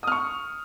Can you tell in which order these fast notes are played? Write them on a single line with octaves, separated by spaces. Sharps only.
D#6 F6 C#6